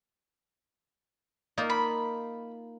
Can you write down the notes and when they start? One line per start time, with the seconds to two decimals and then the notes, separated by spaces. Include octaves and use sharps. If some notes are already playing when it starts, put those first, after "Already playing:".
1.58 A#3 D#4 F4
1.70 B5